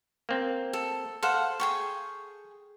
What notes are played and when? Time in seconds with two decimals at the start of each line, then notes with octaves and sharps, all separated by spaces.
0.29 A#3 C4
0.73 A4
1.23 A4 C5 F5 F#5
1.60 G#4 G5 C#6